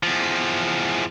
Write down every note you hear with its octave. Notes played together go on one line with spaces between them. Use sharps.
E2 F3